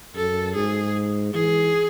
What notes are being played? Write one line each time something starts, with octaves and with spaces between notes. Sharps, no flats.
F#2 A4
G#2 G#4
E3 G#4